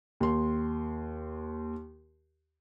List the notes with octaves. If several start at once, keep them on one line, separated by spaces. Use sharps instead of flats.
D#2 C6